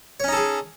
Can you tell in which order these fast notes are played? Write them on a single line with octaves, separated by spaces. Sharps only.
C#5 C#4 D#4 A4 G#4